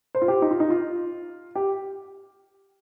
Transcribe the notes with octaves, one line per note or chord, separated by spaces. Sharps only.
C5
F4
G4
D#4
F4
D#4
F4
G4